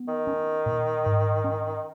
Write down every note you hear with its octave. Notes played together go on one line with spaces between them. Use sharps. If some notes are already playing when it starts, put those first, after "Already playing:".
Already playing: B3
D#3
C#4
A#2
G#2
C#4